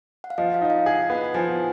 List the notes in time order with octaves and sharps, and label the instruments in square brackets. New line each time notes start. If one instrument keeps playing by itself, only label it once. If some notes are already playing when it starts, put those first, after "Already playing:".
[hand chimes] F#5
F5
[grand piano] F3 [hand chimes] D#5
[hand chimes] F5
[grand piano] D#4 [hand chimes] D#5
[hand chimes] F5
[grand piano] G#4 [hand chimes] F#5
[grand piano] B3
[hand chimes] F#5
[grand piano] F3 [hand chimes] G#5